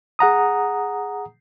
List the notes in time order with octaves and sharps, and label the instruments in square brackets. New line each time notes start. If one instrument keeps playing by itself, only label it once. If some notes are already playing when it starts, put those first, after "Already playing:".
[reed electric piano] G#4 F#5 A#5 D#6